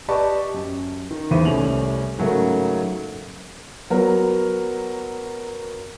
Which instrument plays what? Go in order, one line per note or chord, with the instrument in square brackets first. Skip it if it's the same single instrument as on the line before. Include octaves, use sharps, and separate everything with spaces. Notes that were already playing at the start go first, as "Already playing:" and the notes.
[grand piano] G4 B4 D5 D#5 A5 C#6
F#2
D#3
E2 C#3 C5 E5 D#7
C2 A3 C#4 F7 F#7
G#2 C#3 F#3 A3 A#3
[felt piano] F#3 B3 F#4 A#4